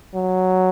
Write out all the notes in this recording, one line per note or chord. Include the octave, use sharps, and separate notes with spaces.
F#3